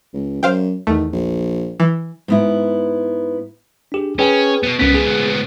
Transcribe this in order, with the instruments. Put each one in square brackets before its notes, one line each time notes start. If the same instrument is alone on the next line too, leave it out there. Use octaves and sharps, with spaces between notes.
[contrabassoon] C#2
[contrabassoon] F#2 [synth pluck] C5 F5 G5
[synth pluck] E2 A3 [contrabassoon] D#3
[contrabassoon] A#1
[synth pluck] E3
[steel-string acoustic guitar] G#2 B3 E4
[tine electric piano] D4 G4 G#4
[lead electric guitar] C#4 [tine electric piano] G#4 B4 G5
[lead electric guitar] B2 B3
[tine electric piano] C2 C#4 B6 [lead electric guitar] G#2 B3
[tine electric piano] G#4